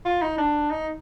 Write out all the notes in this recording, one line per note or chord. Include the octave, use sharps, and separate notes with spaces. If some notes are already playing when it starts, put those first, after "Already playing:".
F4
D#4
D4
D#4